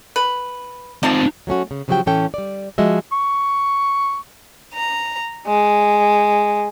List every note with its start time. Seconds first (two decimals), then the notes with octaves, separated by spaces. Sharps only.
0.16 B4
1.03 F3 C4 D#4 A5
1.47 F#3 A3 C#4 F#4
1.71 C#3
1.88 C#3 F3 F#3 F#4 G4 G5
2.06 A2 E3 C#4 A4 G5
2.34 G3 D5
2.78 F3 G#3 F#4 D#5 E5
3.12 C#6
4.74 A#5
5.47 G#3